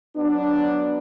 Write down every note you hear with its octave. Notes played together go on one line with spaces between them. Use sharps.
F#3 B3 D4